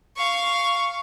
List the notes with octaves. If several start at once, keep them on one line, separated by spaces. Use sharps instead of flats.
F5 C#6